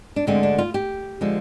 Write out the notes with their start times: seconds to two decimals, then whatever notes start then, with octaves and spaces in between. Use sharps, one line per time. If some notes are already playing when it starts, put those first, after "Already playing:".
0.16 D4
0.27 D2 D3 G#3 C4
0.43 D4
0.58 F4
0.74 G4
1.21 D3 F3 G#3